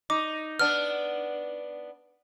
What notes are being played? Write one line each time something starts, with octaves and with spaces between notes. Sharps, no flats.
D#4 D6
B3 D4 F6